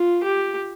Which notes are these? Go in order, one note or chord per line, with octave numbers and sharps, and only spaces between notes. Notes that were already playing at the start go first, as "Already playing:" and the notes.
Already playing: F4
G4